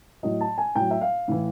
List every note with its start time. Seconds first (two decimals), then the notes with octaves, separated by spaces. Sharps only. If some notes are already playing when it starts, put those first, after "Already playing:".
0.23 A2 F#3 D#5
0.41 A5
0.58 G#5
0.75 A2 F#3 G5
0.91 E5
1.01 F5
1.28 A2 E3